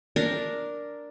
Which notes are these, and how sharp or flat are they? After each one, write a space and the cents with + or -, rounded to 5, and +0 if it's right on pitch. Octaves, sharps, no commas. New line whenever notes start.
D4 +0 A#4 +0